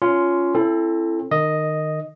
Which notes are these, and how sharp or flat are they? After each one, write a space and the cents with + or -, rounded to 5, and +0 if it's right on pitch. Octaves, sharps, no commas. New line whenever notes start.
C#4 +15 F4 +0 C6 -10
C4 +40 E4 +25 A4 +0
D#3 -25 D#5 +0